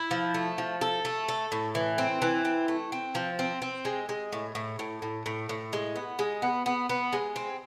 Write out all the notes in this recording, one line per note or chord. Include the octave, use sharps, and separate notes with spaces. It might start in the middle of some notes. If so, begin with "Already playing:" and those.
Already playing: E4
F3
A3
F3
A4
A3
A4
A2
E3
C4
E3
C4
A3
C4
F3
C4
C4
G#3
G#3
A2
A2
A2
A2
A2
A2
G#3
B3
G#3
B3
B3
B3
G#3
C4